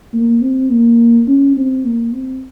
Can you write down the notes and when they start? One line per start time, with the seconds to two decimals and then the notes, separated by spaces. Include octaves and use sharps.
0.13 A#3
0.42 C4
0.70 A#3
1.28 C#4
1.57 C4
1.85 A#3
2.14 C4